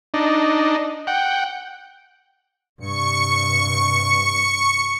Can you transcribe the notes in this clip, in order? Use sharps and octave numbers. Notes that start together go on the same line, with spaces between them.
D4 D#4
F#5 G5
G2 C3 C#6 C#7